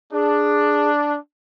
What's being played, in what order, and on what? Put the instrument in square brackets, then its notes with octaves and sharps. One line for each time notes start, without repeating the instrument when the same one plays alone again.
[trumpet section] D4 [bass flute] G#4